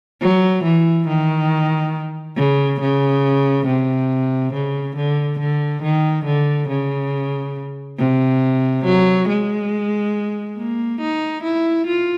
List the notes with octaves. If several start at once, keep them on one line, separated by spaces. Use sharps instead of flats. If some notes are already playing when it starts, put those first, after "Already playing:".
F#3
E3
D#3
C#3
C#3
C3
C#3
D3
D3
D#3
D3
C#3
C3
F#3
G#3
A#3
D#4
E4
F4